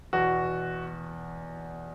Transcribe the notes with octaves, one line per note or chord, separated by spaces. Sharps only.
E2 B2 F#4